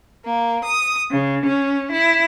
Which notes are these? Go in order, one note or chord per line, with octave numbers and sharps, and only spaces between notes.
A#3
D#6
C#3
C#4
E4